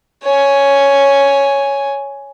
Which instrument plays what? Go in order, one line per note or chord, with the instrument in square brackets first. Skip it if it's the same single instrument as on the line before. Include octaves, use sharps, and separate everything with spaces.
[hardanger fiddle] C#5 G#5